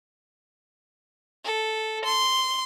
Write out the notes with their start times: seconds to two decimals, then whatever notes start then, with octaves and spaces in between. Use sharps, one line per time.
1.45 A4
2.05 C6